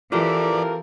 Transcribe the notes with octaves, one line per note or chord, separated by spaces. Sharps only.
F2 E3 A#3 F4 G4 A4 A#4 D5